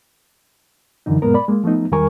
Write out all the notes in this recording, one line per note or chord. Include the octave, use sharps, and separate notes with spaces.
F#2 D3 E3 D#4
F#2 A#2 G#3 B3 A#4
D5 B5
G#3 A#3
F3 A3 B3 D#4
E2 D#3 G3 A#4 G#5 C#6